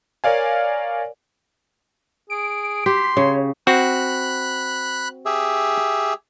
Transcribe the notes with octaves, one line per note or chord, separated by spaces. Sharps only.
A#4 C#5 D5 F5 G#5
G#4 D7
G4 C6 B6
C#3 C#5
C4 F#4 B5 F#6
G4 G#4 E5